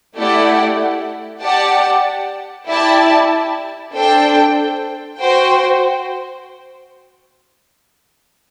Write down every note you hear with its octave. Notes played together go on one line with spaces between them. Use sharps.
A3 E4 G4 D5 F#5
G4 D5 F#5 A5
E4 G4 D5 A5
D4 A4 C5 G5
F#4 C5 G5